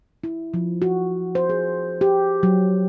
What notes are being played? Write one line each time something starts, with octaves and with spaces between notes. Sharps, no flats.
E4
F3
F#4
C5
G#4
G4
F#3